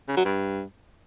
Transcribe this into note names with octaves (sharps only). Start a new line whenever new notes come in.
C#3
F#3
G2